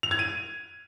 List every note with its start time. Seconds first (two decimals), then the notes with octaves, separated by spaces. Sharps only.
0.03 F7
0.11 G#6
0.19 D#7